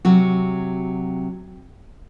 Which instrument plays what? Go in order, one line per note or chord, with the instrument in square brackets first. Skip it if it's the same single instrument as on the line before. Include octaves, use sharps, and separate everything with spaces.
[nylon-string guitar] C3 F#3 F#4